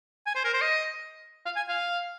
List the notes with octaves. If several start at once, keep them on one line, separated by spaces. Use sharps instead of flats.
G#5
C5
A#4
C5
D#5
F5
G#5
F5